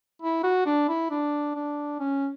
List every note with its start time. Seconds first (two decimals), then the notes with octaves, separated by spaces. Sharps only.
0.22 E4
0.44 F#4
0.66 D4
0.89 E4
1.11 D4
1.55 D4
2.00 C#4